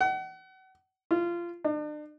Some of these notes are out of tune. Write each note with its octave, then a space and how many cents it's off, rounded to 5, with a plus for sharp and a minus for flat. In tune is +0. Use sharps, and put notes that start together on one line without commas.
F#5 +35
F4 -20
D4 +40